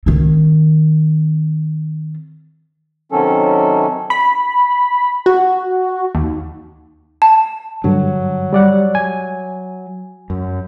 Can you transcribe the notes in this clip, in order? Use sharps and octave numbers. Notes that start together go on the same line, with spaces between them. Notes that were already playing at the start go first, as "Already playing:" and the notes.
D#3 C4
C3 D#3 F#3 C#4 A4
B5
F#4
D#2
A5
G2 D3 F#3
G3 D5 F#5
G#5
F#2